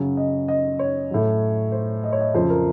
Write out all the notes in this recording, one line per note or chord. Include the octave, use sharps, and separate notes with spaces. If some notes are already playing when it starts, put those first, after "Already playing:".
Already playing: F#2 C#3 F#3
D#5
D#5
C#5
A2 F#3
C5
D#5
C#5
D#5
F2 C#3 F#3 C5
A#4